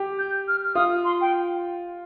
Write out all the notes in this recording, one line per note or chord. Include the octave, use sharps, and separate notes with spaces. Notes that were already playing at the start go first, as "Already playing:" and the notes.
Already playing: G4
G6
F6
F6
F4 D#6
C6
G5